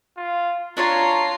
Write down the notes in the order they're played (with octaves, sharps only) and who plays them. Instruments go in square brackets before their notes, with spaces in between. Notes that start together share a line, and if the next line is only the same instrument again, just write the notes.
[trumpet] F4
[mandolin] D4 C#5 A5 [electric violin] F4 C7 [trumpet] A#5